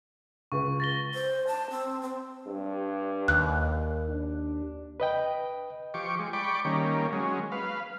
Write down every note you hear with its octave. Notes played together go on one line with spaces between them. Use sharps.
C#2 B4 C#6
A6 A#6 G7
C5
A5
C4
C4
G2
D#2 F#6
D4
B4 D#5 G5
F3 G4 C#6 D6
G#3
D5 G5 B5 C#6 D6
D#3 G3 A#3 C#4
F#3 G#3 C#4
B4 F5